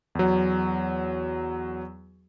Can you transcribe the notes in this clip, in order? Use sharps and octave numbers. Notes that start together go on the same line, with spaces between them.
E2 F#3